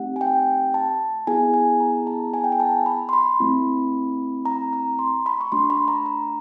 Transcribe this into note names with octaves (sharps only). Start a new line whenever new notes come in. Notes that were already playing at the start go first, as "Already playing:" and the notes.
Already playing: A3 C4 D#4 G4 F#5
G#5
G5
A5
B3 E4 G#4 G#5
G#5
A#5
A5
G#5
G5
G#5
A5
B5
C6
B5
A3 C4 E4
A#5
A#5
C6
B5
C#6
A3 D4 F#4 C6
B5
A#5
A#5